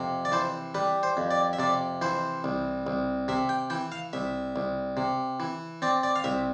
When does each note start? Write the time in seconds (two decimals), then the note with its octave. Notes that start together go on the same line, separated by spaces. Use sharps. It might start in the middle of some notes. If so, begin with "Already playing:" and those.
Already playing: F2 C3
0.25 D5
0.32 E3 C5
0.75 G3 B4
1.03 C5
1.17 F2
1.31 D5
1.53 E5
1.59 C3 D5
2.02 E3 C5
2.44 C2
2.87 C2
3.28 C3 E5
3.49 G5
3.70 E3 G5
3.92 F5
4.13 C2 E5
4.56 C2
4.97 C3
5.40 E3
5.82 C4 D5
6.03 D5
6.16 F5
6.24 C2 E5